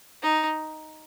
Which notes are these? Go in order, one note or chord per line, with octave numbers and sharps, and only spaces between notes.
D#4